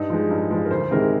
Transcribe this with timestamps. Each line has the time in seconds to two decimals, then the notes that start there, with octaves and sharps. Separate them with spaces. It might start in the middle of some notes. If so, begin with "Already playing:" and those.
Already playing: G2 D#4
0.10 F3 G#3
0.30 G2
0.51 F3 G#3
0.64 A#4
0.71 D2 C5
0.91 C3 D#3 G#3 A#4